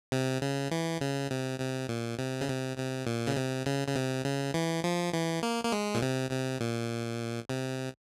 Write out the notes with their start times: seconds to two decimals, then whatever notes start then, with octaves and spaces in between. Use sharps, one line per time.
0.12 C3
0.42 C#3
0.71 E3
1.01 C#3
1.31 C3
1.60 C3
1.89 A#2
2.19 C3
2.41 C#3
2.48 C3
2.78 C3
3.07 A#2
3.27 C#3
3.37 C3
3.66 C#3
3.88 C#3
3.95 C3
4.25 C#3
4.54 E3
4.84 F3
5.13 E3
5.43 A#3
5.64 A#3
5.72 G#3
5.95 A#2
6.02 C3
6.31 C3
6.60 A#2
7.49 C3